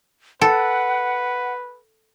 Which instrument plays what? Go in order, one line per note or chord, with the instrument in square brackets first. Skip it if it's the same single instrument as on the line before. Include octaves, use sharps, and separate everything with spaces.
[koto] A4 [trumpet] B4 [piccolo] F#5